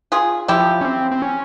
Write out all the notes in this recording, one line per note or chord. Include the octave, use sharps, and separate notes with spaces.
F4 G#4
F3 E4 G4
C#4
C4
C4
C#4